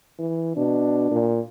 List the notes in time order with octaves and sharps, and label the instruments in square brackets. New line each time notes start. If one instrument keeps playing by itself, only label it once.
[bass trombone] E3
[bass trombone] B2 [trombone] D4
[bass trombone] A#2